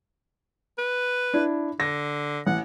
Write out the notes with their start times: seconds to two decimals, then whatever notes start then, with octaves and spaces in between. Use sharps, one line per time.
0.78 B4
1.34 D4 E4
1.80 D3 A#6
2.47 A1 F#5